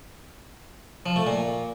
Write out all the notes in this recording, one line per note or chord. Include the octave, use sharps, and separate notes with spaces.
F3
A3
A#2